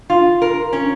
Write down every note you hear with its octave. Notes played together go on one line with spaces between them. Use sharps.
F4
A#4
C#4